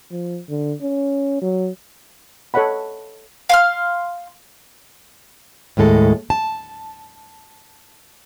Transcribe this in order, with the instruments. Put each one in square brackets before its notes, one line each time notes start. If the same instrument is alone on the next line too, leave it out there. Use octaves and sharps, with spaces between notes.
[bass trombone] F3
D3
C#4
F#3
[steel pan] A4 C#5 D#5 F#5 B5
[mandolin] F5 C6 F6
[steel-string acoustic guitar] D#2 A2 G#3 A4
A5